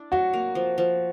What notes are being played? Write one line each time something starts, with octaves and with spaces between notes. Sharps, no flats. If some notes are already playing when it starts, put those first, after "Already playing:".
Already playing: D4 E4
F#3 F#4
A#3
F3
F3